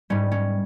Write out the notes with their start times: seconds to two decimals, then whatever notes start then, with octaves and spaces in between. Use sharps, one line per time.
0.10 G#2 G3 C#4
0.32 C#4